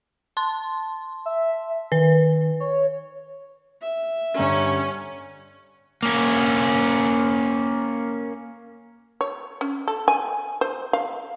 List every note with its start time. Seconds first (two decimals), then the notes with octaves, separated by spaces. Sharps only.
0.37 A5 C6
1.26 E5
1.92 D#3 B4
2.60 C#5
3.82 E5
4.37 G2 D3 C#4 A#5
6.03 A#3 C#4
9.21 C#5
9.61 C#4
9.88 A4
10.08 G#5
10.61 C5
10.93 F5